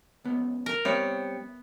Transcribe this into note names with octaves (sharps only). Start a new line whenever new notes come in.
C#2 B3
A#4
G3 B3 C4 C#5 E5